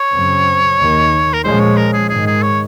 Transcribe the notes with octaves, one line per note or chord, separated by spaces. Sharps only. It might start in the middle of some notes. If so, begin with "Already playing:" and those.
Already playing: C#5
F#2 C#3 F#3 C4
D#2 D#3 A#3
A#4
A#2 F3 G#3 C#4 C5
C#5
A#4
G#4
G#2 D#3 G#3 G#4
G#4
C#5